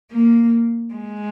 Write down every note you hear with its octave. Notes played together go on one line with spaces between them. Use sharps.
A#3
G#3